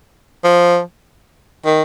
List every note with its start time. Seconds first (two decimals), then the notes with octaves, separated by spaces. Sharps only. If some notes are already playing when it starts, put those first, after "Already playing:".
0.44 F3
1.65 D#3